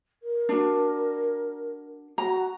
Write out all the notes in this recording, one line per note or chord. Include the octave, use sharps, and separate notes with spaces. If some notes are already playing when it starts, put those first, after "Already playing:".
A#4
D4 F#4
F#4 A#5